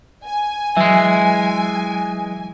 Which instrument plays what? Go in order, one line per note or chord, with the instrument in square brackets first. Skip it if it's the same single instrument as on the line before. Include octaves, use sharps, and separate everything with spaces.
[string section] G#5
[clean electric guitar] E3 G#3 [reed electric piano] F#3 E5